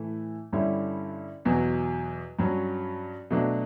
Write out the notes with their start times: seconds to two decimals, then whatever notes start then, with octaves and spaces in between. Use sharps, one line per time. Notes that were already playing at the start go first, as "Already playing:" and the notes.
Already playing: A2 E3 A3 E4
0.53 G2 D3 G3 C#4 E4
1.45 E2 B2 F#3
2.39 G2 F#3 C#4
3.31 B2 F#3 A3 D4